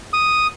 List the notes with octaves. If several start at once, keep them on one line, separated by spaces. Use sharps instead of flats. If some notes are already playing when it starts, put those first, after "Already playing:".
D#6